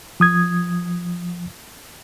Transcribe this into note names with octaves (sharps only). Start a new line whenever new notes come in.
F3 D#6 G#6